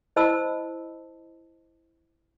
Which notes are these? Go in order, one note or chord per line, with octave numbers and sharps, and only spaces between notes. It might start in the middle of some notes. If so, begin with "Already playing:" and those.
E4 C5 D#5 A5 B5 E6